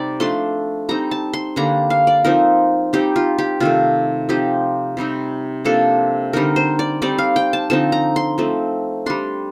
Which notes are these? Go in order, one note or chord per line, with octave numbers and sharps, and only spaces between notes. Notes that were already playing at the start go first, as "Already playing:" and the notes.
Already playing: C3 G3 C4 D#4 D5
F3 A3 D4 C6
G3 C4 D#4 A#5
A5
C6
D3 G3 A#3 D4 A#5
F5
D5
F3 C4 D#4 A#4
G3 C4 D#4 G4
F4
G4
C3 D#3 A3 F4
F3 C4 D#4 G4
C3 G3 C4 D#4
C3 F3 A#3 D4 A4
D3 G3 C4 D#4 A#4
C5
D5
G3 C4 D#4 D5
F5
G5
A5
D3 F3 C4 D#4 A5
A#5
C6
F3 A3 C4
G3 D4 C6